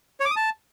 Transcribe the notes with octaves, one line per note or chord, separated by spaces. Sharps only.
C#5
D6
D#6
A5